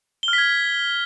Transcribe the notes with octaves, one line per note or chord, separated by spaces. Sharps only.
G7
F6
B6
G#6